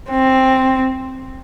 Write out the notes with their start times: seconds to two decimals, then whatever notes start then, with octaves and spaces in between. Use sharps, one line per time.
0.10 C4